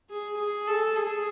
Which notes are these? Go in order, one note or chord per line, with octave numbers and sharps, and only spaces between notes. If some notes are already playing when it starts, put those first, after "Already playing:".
G#4
G#4
A4
G#4